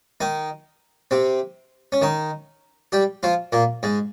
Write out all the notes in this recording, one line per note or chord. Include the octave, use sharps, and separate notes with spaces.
D#3 D#4
C3 C4
C#4
D#3 D#4
G3 G4
F3 F4
A#2 A#3
G#2 G#3